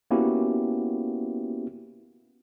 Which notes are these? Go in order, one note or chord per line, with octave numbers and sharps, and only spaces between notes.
A#3 B3 C#4 E4 F#4 G4